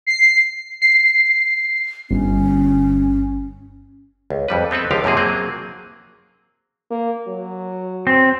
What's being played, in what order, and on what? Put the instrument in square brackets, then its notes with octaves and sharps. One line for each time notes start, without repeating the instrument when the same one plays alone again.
[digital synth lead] C7
[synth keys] C7
[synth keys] G1 [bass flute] C#4
[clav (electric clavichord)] C#2
F2 G3 B4
B3 C4 A4 B4
C#2 D3 F3 G4 A#4 F5
F#2 C3 F3 A#3 G#4
F#3 A#3 C4 G#4
[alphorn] A#3
F#3
[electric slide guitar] C4